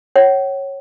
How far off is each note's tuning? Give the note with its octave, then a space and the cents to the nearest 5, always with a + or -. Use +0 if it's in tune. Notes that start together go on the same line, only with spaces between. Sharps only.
C#5 -15 F#5 +45